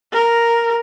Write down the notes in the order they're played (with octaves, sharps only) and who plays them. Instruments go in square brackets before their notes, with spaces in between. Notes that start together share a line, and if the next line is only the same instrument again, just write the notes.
[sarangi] A#4